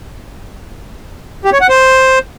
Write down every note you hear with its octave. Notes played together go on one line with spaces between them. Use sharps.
G4
C#5
F#5
C5